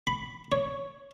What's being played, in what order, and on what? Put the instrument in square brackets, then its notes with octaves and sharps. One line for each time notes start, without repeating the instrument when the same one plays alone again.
[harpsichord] B5
C#5